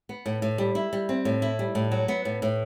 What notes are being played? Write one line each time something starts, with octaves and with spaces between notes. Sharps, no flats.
B3
A2
A2
G3
E4
G3
C4
A2
E4
G3
A2
F#3
B3
A2
A2